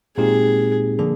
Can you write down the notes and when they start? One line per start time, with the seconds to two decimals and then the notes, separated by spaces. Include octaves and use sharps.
0.17 A#2 G#3 C4 D#4 G4 G#4
0.99 D3 F3 A#3 D4 G#4